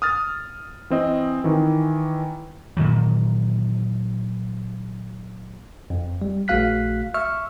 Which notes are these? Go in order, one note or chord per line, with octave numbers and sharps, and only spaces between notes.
D#6 F6 A6
E3 C4 D#5
D#3 E3
A#2 D#3 E3 F#3
F2
G3
A#1 A3 F#4 F5 F#6 B6
E5 C#6 E6 F6